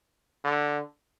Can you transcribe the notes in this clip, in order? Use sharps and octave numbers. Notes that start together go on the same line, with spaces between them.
D3